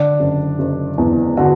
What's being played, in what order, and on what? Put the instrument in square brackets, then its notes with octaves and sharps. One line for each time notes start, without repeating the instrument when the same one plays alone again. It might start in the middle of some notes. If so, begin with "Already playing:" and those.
Already playing: [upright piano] D3 D4
F#1
F#1
E2
D3 F#4